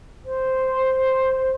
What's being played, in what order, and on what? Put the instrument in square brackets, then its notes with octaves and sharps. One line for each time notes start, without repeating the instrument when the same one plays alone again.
[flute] C5